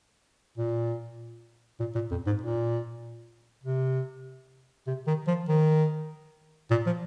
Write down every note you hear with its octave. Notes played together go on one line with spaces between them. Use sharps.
A#2
A#2
A#2
F2
G#2
A#2
C3
C3
D#3
F3
D#3
A#2
F3